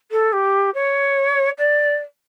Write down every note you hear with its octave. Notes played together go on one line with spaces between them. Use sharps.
A4
G4
C#5
D5